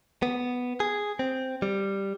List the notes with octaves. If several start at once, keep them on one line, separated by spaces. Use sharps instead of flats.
B3
G#4
C4
G3